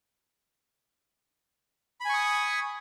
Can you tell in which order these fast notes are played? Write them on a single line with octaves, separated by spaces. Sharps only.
B5 G#5 C#6 D#6